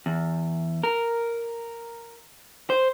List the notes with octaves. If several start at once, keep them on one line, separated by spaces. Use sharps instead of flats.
E2
A#4
C5